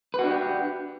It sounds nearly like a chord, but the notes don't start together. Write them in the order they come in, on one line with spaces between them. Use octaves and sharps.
B4 F#4 D4 G4